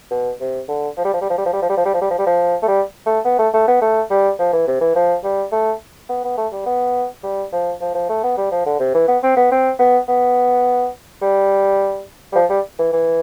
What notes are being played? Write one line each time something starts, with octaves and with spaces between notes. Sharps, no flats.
B2
C3
D3
F3
G3
F3
G3
F3
G3
F3
G3
F3
G3
F3
G3
F3
G3
F3
G3
F3
A3
G3
A3
B3
A3
A3
B3
A3
G3
F3
E3
C3
E3
F3
G3
A3
B3
B3
A3
G3
B3
G3
F3
F3
F3
A3
B3
G3
F3
D3
C3
E3
B3
C4
B3
C4
B3
B3
G3
G3
F3
G3
E3
E3